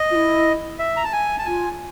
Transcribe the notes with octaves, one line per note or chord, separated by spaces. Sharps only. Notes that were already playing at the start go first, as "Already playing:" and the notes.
Already playing: D#5
F4
E4
E5
A#5
A5
G#5
A5
F4 G#5